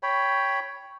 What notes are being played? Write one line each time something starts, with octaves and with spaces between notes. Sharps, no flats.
C#5 G5 B5